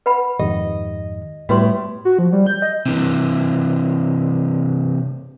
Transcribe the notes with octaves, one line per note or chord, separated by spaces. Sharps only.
B4 F#5 B5
F2 G#2 D#3 G4 D#5
A2 G3 B3 F#4 B4 C6
F#4
F3
G3
G6
D#5
C3 E3